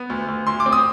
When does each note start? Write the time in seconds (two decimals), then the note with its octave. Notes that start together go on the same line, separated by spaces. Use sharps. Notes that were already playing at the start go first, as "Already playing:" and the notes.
Already playing: B3
0.10 D2
0.28 D2
0.47 D2 C6
0.60 D6
0.66 C4
0.72 D#6